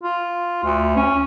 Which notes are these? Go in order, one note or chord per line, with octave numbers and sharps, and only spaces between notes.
F4
D2
C#4